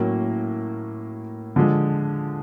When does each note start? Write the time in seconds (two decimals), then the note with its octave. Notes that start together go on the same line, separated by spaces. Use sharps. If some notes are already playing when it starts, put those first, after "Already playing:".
Already playing: A2 F#3 A#3 C#4
1.56 D3 F3 G#3